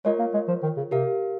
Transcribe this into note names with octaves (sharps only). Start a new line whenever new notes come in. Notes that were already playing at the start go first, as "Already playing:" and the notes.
G#3 F4 A#4 C#5
A#3
G#3
F3
D#3
C#3
C3 G4 A#4 F5